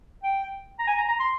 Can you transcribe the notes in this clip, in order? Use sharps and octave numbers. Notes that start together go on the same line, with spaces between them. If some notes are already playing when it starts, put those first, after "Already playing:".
G5
A#5
G#5
A#5
A#5
C6